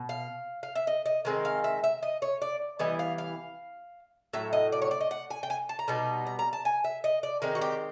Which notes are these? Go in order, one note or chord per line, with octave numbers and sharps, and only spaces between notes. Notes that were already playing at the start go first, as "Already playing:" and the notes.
Already playing: B2
F5
F5
E5
D#5
D#5
D#3 G#3 C4 D#4
F5
E5
E5
D#5
C#5
D5
E3 G3 B3 E4 D#5
F5
F5
A2 F#3 E5
D#5
D5
C#5
D5
D#5
F#5
G#5
G5
G#5
A5
A#5
B2 G3 B3 D#4
A#5
A#5
A5
G#5
E5
D#5
D5
D#3 G#3 C4 D#4
F#4
G4